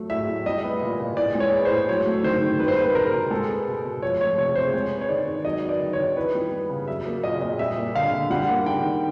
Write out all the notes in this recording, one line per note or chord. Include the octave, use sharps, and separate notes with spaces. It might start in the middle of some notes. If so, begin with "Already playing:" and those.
Already playing: F#3 A3
A2 E5
A2
G3 D#5
B3
A#2
A#2
E3 D5
G#3
C#5
B3
C5
A2
F#3 C#5
A3
D#3 C5
D#3
G3 B4
C5
A#3 B4
B2 A#4
B2
G#3 A4
B3
B2
B2
F3 C#5
A3 C#5
C3 C#5
C3 C5
G#3 C#5
B3
C#5
D#3 D5
D#3
F#3 D#5
B3
D5
D#3
C#5
D#3
E3 B4
G3
B3
C#3
F#3 E5
A#3
A#2 D#5
A#2 D#5
G3 E5
A#3
D3 F5
D3
G3 F#5
A#3
D#3 G5
D#3